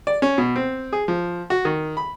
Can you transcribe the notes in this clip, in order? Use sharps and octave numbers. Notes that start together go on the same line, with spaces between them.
D5
C#4
B2
C4
G#4
F3
F#4
D#3
B5